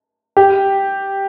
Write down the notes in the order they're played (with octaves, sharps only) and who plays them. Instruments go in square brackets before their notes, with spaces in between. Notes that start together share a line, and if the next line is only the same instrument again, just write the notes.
[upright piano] G4